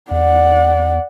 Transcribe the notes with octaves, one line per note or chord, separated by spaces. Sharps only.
E2 D5 F#5